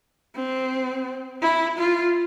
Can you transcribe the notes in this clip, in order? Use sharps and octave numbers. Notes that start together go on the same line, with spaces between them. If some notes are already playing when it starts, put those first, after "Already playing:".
C4
E4
F4